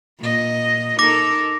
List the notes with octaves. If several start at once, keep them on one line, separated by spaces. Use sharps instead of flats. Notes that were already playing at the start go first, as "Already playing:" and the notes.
A#2 D#5
D#4 A4 A#4 D6 A#6